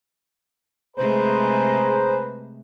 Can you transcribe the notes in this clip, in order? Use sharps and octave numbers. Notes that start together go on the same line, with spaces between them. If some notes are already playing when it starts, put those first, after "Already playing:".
C3 G#3 A3 G#4 B4 C5 A#5